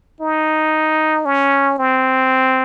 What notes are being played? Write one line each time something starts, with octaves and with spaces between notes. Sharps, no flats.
D#4
C#4
C4